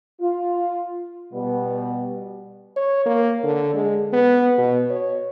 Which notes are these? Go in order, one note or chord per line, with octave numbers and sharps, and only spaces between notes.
F4
B2 G3 B3
C#5
A#3
D3
G#3
B3
B2
C#5